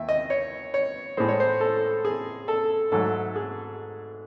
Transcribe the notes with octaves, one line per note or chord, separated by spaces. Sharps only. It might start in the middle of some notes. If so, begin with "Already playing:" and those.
Already playing: D#2 E5
D#5
C#5
C#5
A2 G#3 C5
C#5
C5
A4
G#4
A4
G#2 F#3 A3 A4
G#4